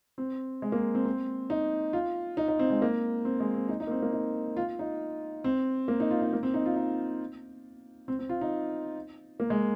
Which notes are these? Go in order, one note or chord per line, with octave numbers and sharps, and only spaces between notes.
C4
G#3
A#3
C4
C4
D#4
F4
D#4
D#4
C4
G#3
A#3
C4
G#3
C4
D#4
D#4
A#3
C4
A#3
D#4
F4
D#4
C4
A#3
D#4
F4
D#4
A#3
C4
D#4
F4
D#4
C4
C4
F4
D#4
A#3
G#3